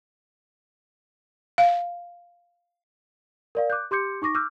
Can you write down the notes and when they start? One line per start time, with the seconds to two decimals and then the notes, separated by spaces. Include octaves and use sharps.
1.58 F5
3.55 A#4 D5 F5
3.70 D6 F#6 G6
3.91 G4 C6 D6 G6 C#7
4.22 D#4 C#6 D6 A#6
4.35 D6 E6 F6 G6